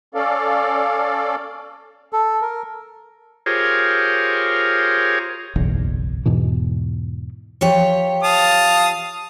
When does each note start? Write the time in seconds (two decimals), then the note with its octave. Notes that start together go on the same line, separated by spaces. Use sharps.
0.15 C#4 A4 D5 F5
2.13 A4
2.41 A#4
3.46 F4 G4 G#4 A#4 C5 C#5
5.56 F#1 B1 E2
6.26 E2 G#2 B2 E3
7.61 F3 G4 C#5
8.23 F5 A5 D#6